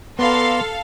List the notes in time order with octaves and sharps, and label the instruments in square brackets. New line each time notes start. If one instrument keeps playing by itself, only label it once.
[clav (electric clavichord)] B3 B4 [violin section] A4 F5 [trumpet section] D5 A#5 C6